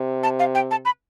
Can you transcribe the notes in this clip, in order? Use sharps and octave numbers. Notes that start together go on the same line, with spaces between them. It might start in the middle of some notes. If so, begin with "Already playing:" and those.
Already playing: C3
A5
F5
G5
A5
B5